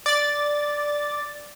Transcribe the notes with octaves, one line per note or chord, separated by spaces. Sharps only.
D5 A6